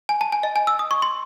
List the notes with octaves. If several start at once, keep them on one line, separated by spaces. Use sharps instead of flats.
G#5
A5
G#5
D#5
G#5
E6
D#6
C#6
C6